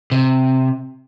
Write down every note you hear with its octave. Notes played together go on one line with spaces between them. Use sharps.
C3